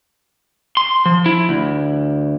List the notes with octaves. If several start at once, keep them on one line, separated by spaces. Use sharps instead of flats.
C6
F3
E4
D2